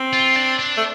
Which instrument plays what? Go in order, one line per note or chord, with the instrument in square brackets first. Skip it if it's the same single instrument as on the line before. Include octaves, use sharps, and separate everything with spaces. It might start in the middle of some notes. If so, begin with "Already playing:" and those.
Already playing: [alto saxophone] C4
[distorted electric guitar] F4
D4
D4
[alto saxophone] A3